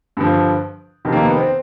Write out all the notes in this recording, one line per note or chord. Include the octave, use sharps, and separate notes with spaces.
G2 D3 F3
F2 C3 D#3
A#3
B3
C4